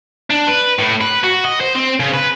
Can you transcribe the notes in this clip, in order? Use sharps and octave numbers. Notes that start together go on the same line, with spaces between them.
D4
B4
A2
B4
F#4
D#5
C5
C4
C#3
B4